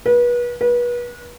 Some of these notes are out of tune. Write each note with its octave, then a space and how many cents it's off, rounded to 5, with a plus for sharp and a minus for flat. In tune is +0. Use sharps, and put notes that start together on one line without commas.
B4 -35
B4 -35